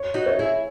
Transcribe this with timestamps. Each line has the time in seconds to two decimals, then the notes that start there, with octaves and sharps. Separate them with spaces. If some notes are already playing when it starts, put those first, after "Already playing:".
Already playing: C#5
0.14 D#4 F#4
0.26 C#5 E5
0.39 E4 G#4